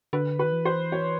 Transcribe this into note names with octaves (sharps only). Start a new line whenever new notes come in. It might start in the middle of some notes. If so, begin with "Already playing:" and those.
D3 B4
B4
D#3
E3
C5
C#5